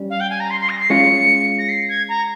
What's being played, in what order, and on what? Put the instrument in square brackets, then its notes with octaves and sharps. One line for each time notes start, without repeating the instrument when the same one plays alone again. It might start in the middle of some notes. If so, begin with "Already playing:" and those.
Already playing: [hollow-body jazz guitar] G3 C#4
[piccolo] F5
G5
G#5
A#5
C6
C6
A#6
C7
[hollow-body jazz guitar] G#3 C#4 F4 [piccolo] C#7
[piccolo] A#6
C7
G#6
A#5